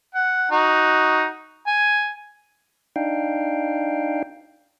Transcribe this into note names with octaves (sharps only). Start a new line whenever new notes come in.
F#5
D#4 F#4
G#5
D4 D#4 F5 G5